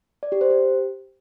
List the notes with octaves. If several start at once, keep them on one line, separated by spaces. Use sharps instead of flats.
D5
G4
C5
G4